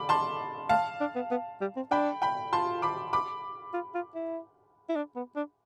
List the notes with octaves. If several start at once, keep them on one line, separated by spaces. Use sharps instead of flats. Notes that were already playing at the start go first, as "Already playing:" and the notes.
Already playing: B5 D6
A5 C6
A3 F5 A5
D4
B3
B3
G3
C4
D4 G5 B5
G5 B5
F4 A5 C6
B5 D6
B5 D6
F4
F4
E4
E4
D4
B3
D4